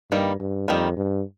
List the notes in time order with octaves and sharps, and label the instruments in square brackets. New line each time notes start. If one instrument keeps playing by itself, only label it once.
[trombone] G2 [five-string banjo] D#3 G3 A#3
[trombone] G2
[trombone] F2 [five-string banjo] D#3 G3 A#3
[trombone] G2